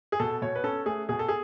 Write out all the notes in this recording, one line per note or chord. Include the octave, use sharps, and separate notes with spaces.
G#4
B2 A4
B2 C#5
B4
C#4 A4
A3 G#4
B2 G#4
A4
G#4